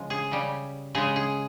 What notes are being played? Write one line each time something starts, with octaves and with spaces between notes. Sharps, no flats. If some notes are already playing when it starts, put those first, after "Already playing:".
Already playing: C#3 F3 G#3
G#4
C#3 G3
C#3 G#3 G#4
G#4